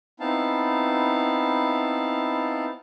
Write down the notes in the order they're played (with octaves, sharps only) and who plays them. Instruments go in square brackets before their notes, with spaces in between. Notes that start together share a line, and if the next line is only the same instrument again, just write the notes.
[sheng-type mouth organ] B3 C4 D#4 E4 F5 A5